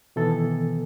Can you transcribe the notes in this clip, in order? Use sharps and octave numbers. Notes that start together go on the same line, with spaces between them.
B2 D#3 E3 B3 A4